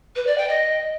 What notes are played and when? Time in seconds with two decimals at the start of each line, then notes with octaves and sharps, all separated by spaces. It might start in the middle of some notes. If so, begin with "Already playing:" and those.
0.16 B4
0.27 D5
0.38 G5
0.49 D#5